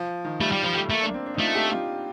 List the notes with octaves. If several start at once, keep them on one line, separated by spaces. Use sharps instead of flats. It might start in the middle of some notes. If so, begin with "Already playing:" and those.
Already playing: F3
D#3
G3 A3
G3
F3 G3
G3
A3
A3 A#3
D4
C4
D4
D#4
A3 F4
G4
F4